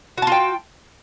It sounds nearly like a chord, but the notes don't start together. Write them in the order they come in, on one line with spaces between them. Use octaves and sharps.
F#4 A5 F4 G5